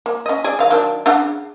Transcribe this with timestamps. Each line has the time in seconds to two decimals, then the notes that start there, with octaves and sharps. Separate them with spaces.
0.06 A#3
0.26 C#4 D#5
0.44 G#4 D5
0.59 D#3 F5
0.71 D#3 F#3 D4
1.06 C#3 D4 F#5